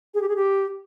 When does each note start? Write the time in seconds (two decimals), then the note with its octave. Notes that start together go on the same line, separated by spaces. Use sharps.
0.14 G#4
0.22 G4
0.29 G#4
0.36 G4